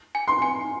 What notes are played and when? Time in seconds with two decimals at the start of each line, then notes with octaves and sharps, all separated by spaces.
0.15 G#5
0.28 C6
0.42 G#5